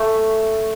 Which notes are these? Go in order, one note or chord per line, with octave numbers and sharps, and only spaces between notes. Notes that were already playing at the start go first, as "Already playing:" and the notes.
Already playing: A3